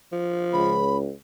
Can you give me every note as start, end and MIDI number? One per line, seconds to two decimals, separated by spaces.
0.12 0.79 53
0.53 1.09 37
0.53 0.98 83